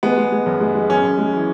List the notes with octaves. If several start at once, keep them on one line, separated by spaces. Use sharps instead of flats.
G#3 B3
G#3
G#3
F#2
G#3
G#3
F#2 C#4
F#2
G#3
E3